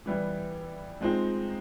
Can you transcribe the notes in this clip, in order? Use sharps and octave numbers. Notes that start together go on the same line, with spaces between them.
E3 G3 B3 E4
F3 G#3 C4 D#4